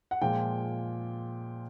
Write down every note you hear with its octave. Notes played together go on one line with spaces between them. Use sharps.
F#5
A#2 F3 G#3 G5